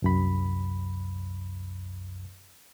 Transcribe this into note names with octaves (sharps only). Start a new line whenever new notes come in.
C2 F#2 B5